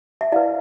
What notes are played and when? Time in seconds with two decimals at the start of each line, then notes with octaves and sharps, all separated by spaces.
0.21 E5
0.32 E4 D5 F5
0.36 B4